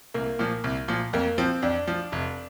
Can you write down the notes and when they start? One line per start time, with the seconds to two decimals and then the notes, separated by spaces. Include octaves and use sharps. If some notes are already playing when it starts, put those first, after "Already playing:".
0.14 C2 A#3
0.39 A#2 F3
0.64 C2
0.88 A#2 F3
1.13 F2 A#3
1.38 F3 C4
1.62 F2 D4
1.87 F3
2.12 F1